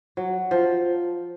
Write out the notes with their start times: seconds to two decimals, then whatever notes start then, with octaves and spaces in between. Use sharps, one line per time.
0.17 F#3
0.51 F3